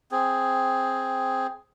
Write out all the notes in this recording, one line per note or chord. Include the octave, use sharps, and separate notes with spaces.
C4 G#4